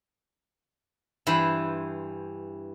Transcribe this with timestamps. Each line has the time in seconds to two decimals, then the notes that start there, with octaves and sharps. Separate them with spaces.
1.27 G2 E3 C5 B5